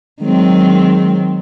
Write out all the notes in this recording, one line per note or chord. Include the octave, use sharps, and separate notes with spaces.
D#3 F#3 G#3 C4